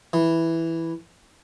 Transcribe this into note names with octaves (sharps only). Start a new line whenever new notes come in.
E3